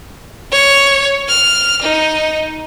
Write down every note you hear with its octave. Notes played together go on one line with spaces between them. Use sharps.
C#5
F6
D#4